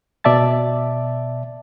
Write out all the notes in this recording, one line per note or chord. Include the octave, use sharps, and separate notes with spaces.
B2 D5 E5 A5 A6